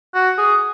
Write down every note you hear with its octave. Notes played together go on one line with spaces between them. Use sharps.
F#4
G#4